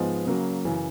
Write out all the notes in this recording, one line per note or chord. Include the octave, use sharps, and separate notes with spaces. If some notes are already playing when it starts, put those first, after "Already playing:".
Already playing: G#2 F3 G#3 B3
C#3 F#3 A#3
F#2 C#3 E3